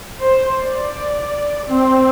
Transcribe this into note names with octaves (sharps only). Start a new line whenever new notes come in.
C5
D5
C4